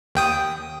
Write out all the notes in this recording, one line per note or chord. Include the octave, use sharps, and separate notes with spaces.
D#2 G5 D#6